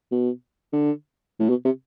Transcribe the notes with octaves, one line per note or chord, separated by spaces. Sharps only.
B2
D3
A2
B2
C3